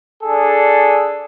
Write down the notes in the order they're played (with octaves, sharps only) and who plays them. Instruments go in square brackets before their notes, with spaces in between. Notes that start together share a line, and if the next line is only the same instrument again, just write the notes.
[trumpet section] D4 G#4 A4